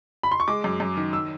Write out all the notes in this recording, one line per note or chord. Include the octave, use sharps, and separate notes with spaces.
B5
C6
C#6
G#3 D6
F#2
F#2
D#3
E6